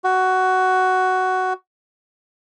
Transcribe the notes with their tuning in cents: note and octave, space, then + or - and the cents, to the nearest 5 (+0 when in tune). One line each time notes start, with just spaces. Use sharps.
F#4 +10